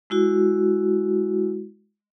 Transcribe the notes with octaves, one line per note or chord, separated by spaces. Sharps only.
G#3 E4 F#4